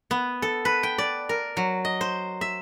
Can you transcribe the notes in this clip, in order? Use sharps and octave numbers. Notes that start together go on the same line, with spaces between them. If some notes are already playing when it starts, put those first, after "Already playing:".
B3
A4
B4
G5
D5
A#4
F#3
D#5
C5
E5